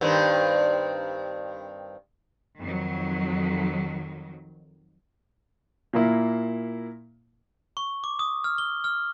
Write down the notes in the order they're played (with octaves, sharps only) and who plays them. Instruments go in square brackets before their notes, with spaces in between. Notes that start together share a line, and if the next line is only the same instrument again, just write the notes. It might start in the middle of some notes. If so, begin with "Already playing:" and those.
[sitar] G2 D#3 C4
[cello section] F2 D#3 F#3
[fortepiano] A#2 A#3 E4
[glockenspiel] C#6
D6
D#6
F6
G7
F6